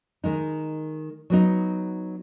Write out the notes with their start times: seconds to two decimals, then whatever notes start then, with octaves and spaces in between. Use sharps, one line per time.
0.24 D#3 G#3 D#4
1.30 F#3 B3 D#4